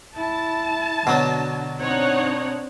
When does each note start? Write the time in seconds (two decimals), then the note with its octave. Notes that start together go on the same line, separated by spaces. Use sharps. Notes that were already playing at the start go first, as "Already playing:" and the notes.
0.17 E4 A5
1.07 B2 D3 F#3
1.81 C4 D4 D#4 C#5 F#5